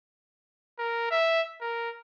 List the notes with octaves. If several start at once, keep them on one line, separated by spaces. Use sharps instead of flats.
A#4
E5
A#4